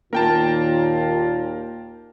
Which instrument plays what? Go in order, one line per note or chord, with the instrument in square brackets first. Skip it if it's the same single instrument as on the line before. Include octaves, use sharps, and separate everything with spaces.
[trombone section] D#2 A#2 [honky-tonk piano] A#3 [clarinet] F4 [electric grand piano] A#4 G5 A5